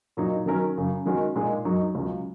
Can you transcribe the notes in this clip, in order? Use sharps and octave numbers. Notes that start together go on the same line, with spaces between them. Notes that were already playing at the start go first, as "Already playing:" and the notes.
A#2 F#3 D#4
D#3 F#3 C#4 A#4
F#2 C#3 F#3
D#3 G#3 C#4 F#4
A#2 G#3 D#4 G#4
F#2 F#3 D#4
C#2 C#3 F#3